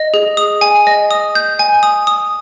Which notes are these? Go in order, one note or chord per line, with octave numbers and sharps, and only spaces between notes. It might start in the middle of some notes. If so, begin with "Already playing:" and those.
Already playing: D#5
G#4
D#6
G#5
D#5
D#6
G6
G#5
D#6
D#6